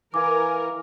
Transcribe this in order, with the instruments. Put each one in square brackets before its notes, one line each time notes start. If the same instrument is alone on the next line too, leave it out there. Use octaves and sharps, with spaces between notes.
[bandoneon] E3 [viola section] A#4 [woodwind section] F5 G#5 [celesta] D6